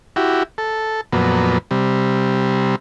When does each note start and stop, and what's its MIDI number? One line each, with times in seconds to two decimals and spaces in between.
0.16 0.43 64
0.16 0.43 66
0.16 0.43 67
0.58 1.01 69
1.13 1.58 41
1.13 1.58 46
1.13 1.58 54
1.13 1.58 59
1.71 2.76 48
1.71 2.76 55